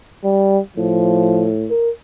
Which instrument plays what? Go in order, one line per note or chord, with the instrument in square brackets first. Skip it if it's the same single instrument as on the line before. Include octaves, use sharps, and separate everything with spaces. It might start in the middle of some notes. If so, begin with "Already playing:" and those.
[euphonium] G3
[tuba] A2 [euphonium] F3
[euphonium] A#4